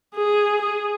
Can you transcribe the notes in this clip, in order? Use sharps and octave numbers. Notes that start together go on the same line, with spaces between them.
G#4
G#4